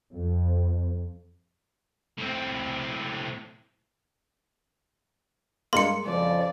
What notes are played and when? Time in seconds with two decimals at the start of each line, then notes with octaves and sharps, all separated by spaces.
0.12 F2
2.18 A2 C4
5.73 G2 G#3 A#3 C6 C#7
6.05 F2 C#3 F3 D5